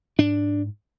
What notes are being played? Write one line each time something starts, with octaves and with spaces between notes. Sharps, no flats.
G#2 D4